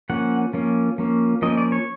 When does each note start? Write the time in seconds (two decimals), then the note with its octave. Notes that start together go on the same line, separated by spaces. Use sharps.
0.10 F3 A#3 C#4 F#5
0.53 F3 A#3 C#4
0.98 F3 A#3 C#4
1.42 F3 A#3 C#4 D#5
1.52 D#5
1.57 D5
1.72 C#5